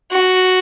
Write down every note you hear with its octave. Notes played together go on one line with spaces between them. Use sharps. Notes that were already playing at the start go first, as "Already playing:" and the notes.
F#4